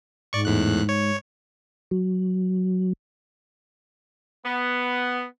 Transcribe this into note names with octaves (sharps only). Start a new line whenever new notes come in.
G#2 D5 C#6
E2 A2 F#6
C#5
F#3
B3